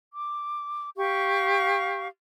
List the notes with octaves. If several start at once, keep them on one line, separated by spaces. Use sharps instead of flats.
D6
G4 F5 C#6